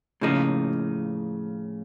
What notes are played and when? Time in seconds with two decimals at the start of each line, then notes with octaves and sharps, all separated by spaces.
0.21 A2 C#3 F3 A#3 D#4